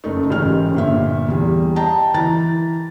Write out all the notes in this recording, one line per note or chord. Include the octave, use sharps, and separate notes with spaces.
F#1 A3 D#4
A1 G#2 G4 F6
G1 A#2 E5
E2 G3
D#5 G5 A5 A#5
E3 A#5 A6